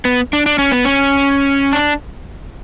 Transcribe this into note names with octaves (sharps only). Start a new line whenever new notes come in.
B3
D4
D4
C#4
B3
C#4
D4